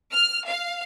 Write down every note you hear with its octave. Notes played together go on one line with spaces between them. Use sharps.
F6
F5